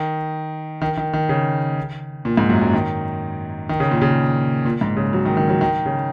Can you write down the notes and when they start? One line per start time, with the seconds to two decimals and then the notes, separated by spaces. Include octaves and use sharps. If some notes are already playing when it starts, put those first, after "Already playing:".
Already playing: D#3
0.82 D#3
0.97 D#3
1.13 D#3
1.29 C#3
2.25 A#2
2.37 G#2
2.49 F#2
2.62 F#2
2.73 D#3
3.69 D#3
3.80 C#3
3.91 A#2
4.02 C#3
4.65 A#2
4.81 G#2
4.97 C#3
5.13 F#3
5.25 D#3
5.37 D#3
5.49 F#3
5.61 D#3
5.86 C#3